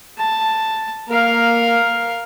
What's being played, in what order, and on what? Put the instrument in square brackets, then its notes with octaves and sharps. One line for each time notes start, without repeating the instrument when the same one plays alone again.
[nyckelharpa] A5
[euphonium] A#3 [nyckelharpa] A#4 F5